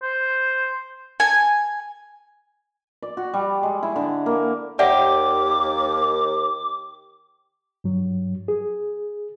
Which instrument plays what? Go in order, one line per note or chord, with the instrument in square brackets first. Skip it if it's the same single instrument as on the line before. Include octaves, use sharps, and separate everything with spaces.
[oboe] C5
[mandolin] G#5
[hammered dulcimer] D5
F#4
G3
G#3
E4
D3
A#3
[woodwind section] D#2 [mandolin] G4 [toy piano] D5 E5 F#5 [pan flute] D6
[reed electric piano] G2 F#3
G#4